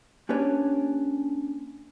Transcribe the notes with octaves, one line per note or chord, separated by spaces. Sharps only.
A#3 C#4 D4 G4 B4 C#5